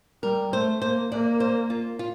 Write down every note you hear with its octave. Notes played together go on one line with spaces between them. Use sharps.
G3 A#4
A3 C5
A#3 C5
A#3 D5
C5
F4
F4